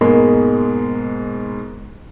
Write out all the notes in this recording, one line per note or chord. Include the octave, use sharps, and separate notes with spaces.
G#2 B2 G#3 A#3